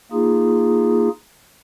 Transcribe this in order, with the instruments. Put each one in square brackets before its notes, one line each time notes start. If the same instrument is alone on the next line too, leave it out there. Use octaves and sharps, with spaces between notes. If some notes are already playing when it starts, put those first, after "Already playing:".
[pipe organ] A#3 D#4 F4 G#4